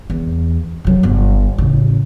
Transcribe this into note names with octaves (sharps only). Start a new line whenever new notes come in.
E2
C3 F#3
G1
A1 C#3